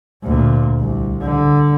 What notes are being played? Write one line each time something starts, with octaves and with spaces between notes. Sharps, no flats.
D2 A#2
C2
D3